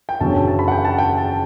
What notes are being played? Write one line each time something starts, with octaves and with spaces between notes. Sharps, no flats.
G5
F#1 E2 D3 F#3 C#4 A5
A5
B5
F#5
G5
A5
G5
A5